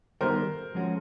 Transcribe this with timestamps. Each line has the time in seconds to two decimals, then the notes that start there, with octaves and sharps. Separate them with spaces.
0.21 D#3 G3 B3 A#4 C5
0.75 F3 G#3 C#4 F#4